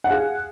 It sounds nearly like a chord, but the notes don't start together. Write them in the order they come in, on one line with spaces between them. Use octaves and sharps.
F#5 F5 G#4